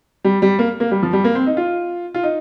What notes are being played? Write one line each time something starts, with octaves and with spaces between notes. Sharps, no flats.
G3
G3
A#3
A#3
G3
F3
G3
A#3
C4
D#4
F4
F4
D#4